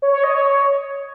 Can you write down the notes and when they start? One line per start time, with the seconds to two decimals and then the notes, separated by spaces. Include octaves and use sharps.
0.02 C#5
0.13 C#5
0.24 D#5
0.34 C#5